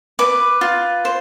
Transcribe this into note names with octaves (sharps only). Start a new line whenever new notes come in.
B4 D6
F4
C5